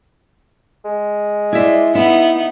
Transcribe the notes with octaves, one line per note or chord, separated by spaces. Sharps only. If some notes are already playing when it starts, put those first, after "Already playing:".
G#3
E4 F4 D5 E5
B3 D#4 E4 E5